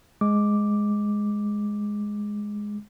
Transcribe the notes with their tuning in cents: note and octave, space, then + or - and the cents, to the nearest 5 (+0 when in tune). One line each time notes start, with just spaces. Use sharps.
G#3 +0 D6 +0